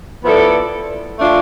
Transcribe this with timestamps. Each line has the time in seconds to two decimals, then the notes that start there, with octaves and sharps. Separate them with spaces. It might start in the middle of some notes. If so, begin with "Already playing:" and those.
0.24 F3 B3 E4 A4 D5
1.18 A3 D4 F4